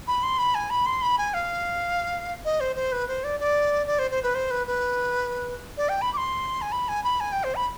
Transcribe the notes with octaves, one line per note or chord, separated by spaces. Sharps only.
B5
C6
B5
G#5
B5
C6
B5
G#5
F5
D#5
C5
C5
B4
C5
D5
D5
D5
C5
C5
B4
C5
B4
B4
D5
G5
B5
D6
C6
G#5
B5
G#5
B5
G#5
G5
C5
B5